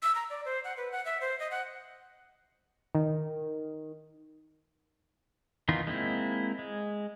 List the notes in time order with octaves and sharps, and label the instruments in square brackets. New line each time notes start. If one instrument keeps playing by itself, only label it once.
[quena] E6
A#5
D5
C5
F#5
B4
F#5
E5
C5
D#5
F#5
[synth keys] D#3
[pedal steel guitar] D#3 E3 B3 D#4 F4
G#3 A#3 C4 E4
G#3